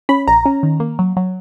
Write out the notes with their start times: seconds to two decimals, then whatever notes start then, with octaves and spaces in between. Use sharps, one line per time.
0.09 C#4 B5
0.27 A#1 A#5
0.46 C#4
0.63 D#3
0.80 A#3
0.99 F#3
1.17 F#3